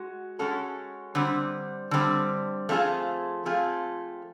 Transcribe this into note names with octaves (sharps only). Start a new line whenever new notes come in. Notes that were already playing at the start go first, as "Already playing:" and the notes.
Already playing: G#3 F#4
G#3 C#4 F#4 A4
D3 G3 C4
D3 G3 C4
F3 A3 C4 F4 G#4
F3 A3 C4 F4 G#4